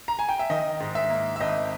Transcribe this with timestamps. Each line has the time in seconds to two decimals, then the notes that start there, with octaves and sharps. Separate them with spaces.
0.08 A#5
0.19 G#5
0.29 G5
0.39 E5
0.50 D#3 D#5
0.80 G#2
0.95 E5
1.10 A#3
1.36 E5
1.41 G#1 D#5